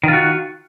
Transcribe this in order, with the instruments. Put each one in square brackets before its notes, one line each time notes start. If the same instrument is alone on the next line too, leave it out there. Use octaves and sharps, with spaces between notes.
[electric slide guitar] D#3
F4
F#4